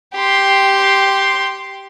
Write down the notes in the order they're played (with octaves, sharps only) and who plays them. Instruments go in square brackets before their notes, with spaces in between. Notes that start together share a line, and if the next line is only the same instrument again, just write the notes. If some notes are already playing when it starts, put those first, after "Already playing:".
[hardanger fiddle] G4 C6